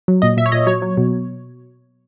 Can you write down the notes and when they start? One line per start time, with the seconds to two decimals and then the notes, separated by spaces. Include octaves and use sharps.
0.08 F#3
0.22 A#2 D#5
0.37 A#2 E5
0.46 C#5
0.52 A#2 D#5
0.67 F#3 C#5
0.82 F#3
0.97 B2